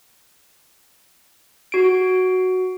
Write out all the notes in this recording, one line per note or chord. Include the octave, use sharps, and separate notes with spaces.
F#4 D7